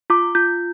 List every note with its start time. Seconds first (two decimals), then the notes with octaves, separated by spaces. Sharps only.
0.10 F4 D6
0.35 F4 G6